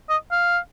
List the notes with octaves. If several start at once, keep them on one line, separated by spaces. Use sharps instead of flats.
D#5
F5